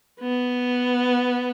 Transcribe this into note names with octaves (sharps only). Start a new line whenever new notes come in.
B3